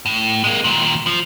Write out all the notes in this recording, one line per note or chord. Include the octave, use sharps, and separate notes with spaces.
A2
G#3 A#3
D#2 A#2
F3